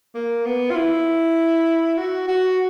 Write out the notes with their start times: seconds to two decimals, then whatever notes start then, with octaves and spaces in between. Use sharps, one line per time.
0.15 A#3
0.45 B3
0.70 F4
0.76 E4
1.97 F#4
2.28 F#4